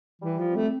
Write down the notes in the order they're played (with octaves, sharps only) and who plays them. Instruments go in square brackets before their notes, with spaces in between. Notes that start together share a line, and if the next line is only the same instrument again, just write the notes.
[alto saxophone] E3 [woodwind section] G3
[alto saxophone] F3
[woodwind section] C4
[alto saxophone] A3